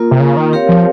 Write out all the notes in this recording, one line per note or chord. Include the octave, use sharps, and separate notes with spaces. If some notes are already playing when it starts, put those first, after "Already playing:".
Already playing: A#3 F4 A#4
C3
C#3
D#3
C4 G4 A#4 C#5 F5
F3